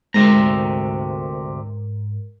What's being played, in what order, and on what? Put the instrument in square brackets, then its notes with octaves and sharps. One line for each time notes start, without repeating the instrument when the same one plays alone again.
[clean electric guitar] D2 C3 A#5 [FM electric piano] G#2 A#4